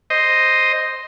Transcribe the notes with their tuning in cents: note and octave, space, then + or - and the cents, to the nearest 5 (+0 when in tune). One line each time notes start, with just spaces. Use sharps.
C5 +0 D#5 +0